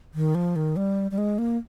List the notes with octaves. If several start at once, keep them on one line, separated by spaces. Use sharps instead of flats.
D#3
F3
D#3
G3
G3
G#3
A#3